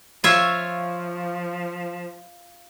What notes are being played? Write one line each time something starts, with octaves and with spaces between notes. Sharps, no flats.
F3 F4 C#5 E5